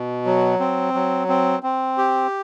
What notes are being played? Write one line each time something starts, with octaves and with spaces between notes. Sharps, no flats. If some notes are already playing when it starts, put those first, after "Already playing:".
Already playing: B2
F#3
C4
F#3
C4
C4
G4